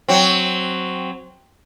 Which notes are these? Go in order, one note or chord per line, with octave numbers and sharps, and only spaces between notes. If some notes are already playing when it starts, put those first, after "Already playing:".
F#3 C4